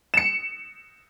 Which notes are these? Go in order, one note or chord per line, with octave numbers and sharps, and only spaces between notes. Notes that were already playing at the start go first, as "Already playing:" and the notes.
C#7 E7